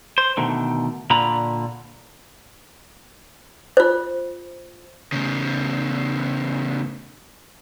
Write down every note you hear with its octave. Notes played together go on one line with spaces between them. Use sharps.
C5
B2 D3 D#3 A3
A#2 D3 F4 A#5 B5
F4 C5
A2 C#3